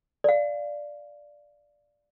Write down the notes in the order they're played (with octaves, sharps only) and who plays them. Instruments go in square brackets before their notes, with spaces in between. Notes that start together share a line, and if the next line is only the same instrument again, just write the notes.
[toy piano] D5 F5